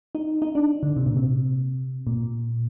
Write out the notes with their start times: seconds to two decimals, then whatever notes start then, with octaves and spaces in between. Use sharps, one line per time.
0.15 D#4
0.42 D#4
0.55 D4
0.83 D3
0.96 C3
1.06 A#2
1.17 C3
2.07 A#2